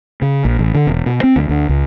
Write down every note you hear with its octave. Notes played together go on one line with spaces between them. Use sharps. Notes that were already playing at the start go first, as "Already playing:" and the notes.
C#3
A#1
A1
D3
E1
B2
C4
D2
D2
C#2